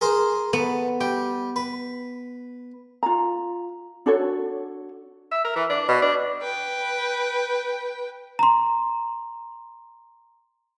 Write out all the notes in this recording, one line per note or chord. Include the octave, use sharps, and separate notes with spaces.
G#4 A#4 C5
A3 B3
G3 G5
B4
F4 A#5
D4 F#4 A4 C#5
E5
A#4
E3
D4
B2
D4
B4 G5
A#5 C6